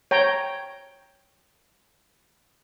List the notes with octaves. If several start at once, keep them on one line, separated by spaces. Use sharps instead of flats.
C#5 G5 A#5